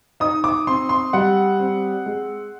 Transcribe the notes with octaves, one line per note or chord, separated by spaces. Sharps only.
D#4 D#6
D6
C4 C6
C6
G3 F#5
C4
G#3